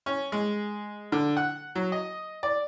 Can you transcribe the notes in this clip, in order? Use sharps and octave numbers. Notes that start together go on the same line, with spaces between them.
C#4
G#3
D3
F#5
F#3
D#5
D5